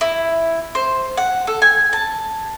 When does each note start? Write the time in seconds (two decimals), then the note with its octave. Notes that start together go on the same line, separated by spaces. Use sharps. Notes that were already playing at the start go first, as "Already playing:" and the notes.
0.01 E4
0.75 C5
1.17 F#5
1.47 A4
1.62 G#5
1.93 A5